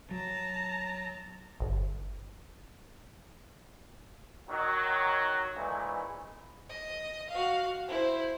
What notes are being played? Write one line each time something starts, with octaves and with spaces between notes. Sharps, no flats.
F#3 A5 A#5
G1
D#3 F#3
A#1 E3 G#3 A3 E4 B4
D#5
F#4 F5
E4 C5